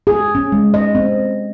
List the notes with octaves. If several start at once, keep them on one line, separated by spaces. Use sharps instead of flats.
G#4
C#4
G#3
D#5
C4